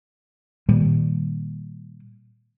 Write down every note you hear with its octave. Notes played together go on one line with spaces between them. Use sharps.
A#2 D#3 G3 A#3